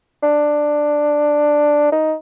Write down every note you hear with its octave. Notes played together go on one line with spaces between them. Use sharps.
D4
D#4